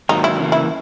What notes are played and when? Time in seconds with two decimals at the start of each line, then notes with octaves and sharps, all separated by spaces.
0.09 G#2 D#3 F#3 A#3 D#4
0.24 E4
0.38 C#3 E3 A#3
0.52 E4